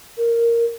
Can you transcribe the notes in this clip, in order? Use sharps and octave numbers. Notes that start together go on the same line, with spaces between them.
A#4